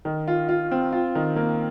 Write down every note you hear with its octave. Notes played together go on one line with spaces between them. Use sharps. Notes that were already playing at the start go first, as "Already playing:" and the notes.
D#3
F4
F4
C4
F4
D#3
A#3